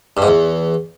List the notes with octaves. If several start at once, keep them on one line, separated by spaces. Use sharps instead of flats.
G2
G#2
E2